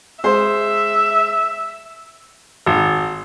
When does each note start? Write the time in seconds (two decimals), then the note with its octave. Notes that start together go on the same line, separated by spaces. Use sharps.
0.24 G#3 C5 E5
2.66 G#1